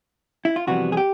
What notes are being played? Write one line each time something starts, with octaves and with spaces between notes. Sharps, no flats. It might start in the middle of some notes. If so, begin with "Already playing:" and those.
E4
F4
F2 C3 E3 G3 B3 F#4
G#4
G4